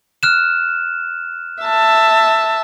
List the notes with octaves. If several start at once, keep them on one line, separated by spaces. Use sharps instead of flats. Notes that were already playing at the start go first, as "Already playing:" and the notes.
F6 F#6 E7
E5 A5